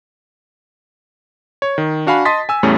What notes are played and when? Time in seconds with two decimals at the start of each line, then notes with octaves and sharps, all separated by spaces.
1.62 C#5
1.78 D#3
2.07 D4 F#4 F5 G#5 B5
2.25 D#5 A5 C6 D#6 A6 B6
2.49 G#5 E6
2.63 E2 A2 G3 A3 C#4